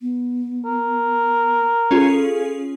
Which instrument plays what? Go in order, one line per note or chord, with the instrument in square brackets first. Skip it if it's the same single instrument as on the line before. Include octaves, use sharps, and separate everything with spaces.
[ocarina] B3
[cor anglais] A#4
[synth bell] C#4 F4 G#4 [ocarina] A4